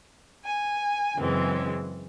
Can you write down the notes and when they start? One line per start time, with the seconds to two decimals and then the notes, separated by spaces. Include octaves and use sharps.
0.45 G#5
1.17 F#2 C#3 E3 G#3 C4